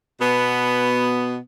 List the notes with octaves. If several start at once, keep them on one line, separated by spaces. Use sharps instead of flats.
B2 B3